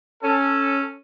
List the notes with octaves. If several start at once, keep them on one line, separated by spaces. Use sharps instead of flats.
C#4 A4